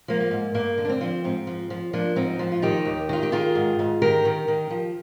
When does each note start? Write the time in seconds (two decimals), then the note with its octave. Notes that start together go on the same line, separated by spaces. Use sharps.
0.08 F3 A#3
0.20 A#3
0.31 G#2
0.54 G2 A#3
0.78 D3
0.85 D4
0.89 C4
1.01 F3
1.24 G#2 C4
1.47 F3
1.70 F3
1.93 F3 A#3 D4
2.16 G#2 C4 D#4
2.39 F3
2.52 F4
2.62 D#3 D#4 G4
2.85 D#2
3.09 D#3 F4
3.23 G4
3.32 D#3 F4 G#4
3.55 G#2
3.79 G#2
4.02 D#3 G4 A#4
4.25 D#3
4.48 D#3
4.70 F3